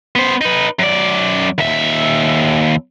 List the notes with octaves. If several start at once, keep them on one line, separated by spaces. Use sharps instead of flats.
B3 C5
D#4 B4
F#2 D5
D#2 E5